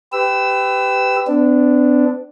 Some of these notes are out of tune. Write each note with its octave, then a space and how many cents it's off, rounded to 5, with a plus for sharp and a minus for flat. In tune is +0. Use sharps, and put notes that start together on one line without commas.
G4 +0 B4 +30 E6 +0
B3 +45 D4 +0